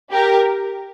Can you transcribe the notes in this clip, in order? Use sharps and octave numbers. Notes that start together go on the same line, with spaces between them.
G4 A#4